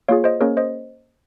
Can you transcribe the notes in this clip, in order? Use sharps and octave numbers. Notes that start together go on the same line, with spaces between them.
A#3 F4 G#4 C#5 F5
C5 D#5
A#3 C#4 G#4 A#4 C#5
C5 D#5